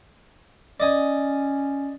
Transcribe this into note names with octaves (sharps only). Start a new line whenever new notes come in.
C#4 D5 D#5 G#5